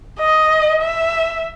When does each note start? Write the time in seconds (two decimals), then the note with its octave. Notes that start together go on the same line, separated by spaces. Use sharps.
0.19 D#5
0.82 E5